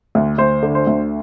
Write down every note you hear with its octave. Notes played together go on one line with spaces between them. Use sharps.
D2
D2 C5
D3
C5
D2